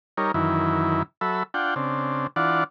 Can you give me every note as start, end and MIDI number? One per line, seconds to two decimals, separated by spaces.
0.18 0.32 55
0.18 0.32 63
0.18 0.32 70
0.18 0.32 73
0.34 1.03 42
0.34 1.03 51
0.34 1.03 52
0.34 1.03 64
1.21 1.43 54
1.21 1.43 69
1.21 1.43 76
1.21 1.43 83
1.54 1.74 62
1.54 1.74 65
1.54 1.74 78
1.54 1.74 79
1.76 2.27 49
1.76 2.27 60
1.76 2.27 62
2.36 2.64 52
2.36 2.64 62
2.36 2.64 65
2.36 2.64 74
2.36 2.64 78